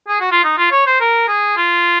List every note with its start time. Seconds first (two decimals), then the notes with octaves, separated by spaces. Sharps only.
0.08 G#4
0.20 F#4
0.31 F4
0.44 D#4
0.57 F4
0.72 C#5
0.86 C5
1.00 A#4
1.28 G#4
1.57 F4